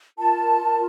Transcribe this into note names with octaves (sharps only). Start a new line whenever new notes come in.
F4 A#4 A5